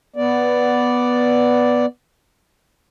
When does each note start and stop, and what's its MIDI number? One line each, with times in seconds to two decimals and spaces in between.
0.16 1.86 59
0.16 1.86 74